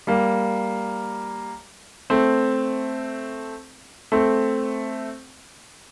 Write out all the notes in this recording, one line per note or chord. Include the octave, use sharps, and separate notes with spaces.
G3 A#3
A3 C4
A3 C4